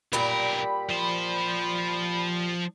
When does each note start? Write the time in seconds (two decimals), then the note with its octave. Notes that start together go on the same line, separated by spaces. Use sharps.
0.13 B1 A#2 G3 G4 A#4 B5
0.90 F3 C5